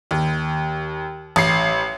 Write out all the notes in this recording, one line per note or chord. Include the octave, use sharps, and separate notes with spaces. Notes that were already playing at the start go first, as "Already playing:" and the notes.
D#2
A1 C7